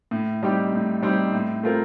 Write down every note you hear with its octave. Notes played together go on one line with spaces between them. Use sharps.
A2
G3 C4 D#4 G4
A2
G3 C4 D#4 G4
A2
A3 C4 F4 A#4